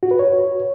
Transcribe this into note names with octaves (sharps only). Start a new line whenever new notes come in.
F#4
B4
C#5